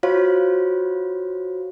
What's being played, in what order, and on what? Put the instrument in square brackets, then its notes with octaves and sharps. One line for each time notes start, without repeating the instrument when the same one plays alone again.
[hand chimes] F4 F#4 C5 C#5 F5